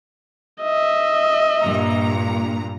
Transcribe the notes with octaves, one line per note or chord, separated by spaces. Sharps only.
D#5 E5
G2 A#2 A#5